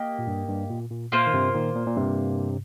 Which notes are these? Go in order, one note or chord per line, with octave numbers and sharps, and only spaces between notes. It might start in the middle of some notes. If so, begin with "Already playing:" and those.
Already playing: A#3 G4 D#5
A#2
G2
G2
A#2
A#2
A#2 A#3 F4 C5
D#3
G2 C3
A#2 D#3
A#2
A#2
G2 C3